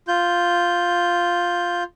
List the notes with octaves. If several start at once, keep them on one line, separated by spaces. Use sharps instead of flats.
F4 G6